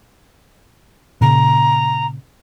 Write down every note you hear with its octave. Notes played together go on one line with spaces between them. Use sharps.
A#2 C#3 A#5